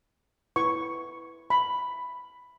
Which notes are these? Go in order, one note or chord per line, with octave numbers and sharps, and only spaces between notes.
E4 B4 C#6
B5